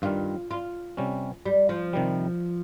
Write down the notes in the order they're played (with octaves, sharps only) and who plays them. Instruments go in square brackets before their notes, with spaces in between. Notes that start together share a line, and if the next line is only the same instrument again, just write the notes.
[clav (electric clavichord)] G2 D#3 G3 [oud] F4
[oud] F4
[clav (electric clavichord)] C3 G3 C#4
[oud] G3
F3
[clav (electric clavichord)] C3 D#3 G3